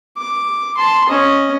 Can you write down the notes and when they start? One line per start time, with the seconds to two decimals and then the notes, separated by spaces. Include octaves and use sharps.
0.17 D6
0.77 A5 C6
1.09 C#4 D#5